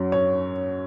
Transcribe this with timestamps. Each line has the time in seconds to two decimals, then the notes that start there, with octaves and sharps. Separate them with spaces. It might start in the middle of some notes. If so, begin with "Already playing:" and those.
Already playing: F#2 F#3
0.12 C#5